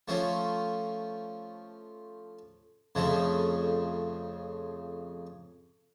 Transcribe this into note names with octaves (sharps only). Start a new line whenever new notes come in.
F3 A3 C#4 F4
F2 C#3 F3 A3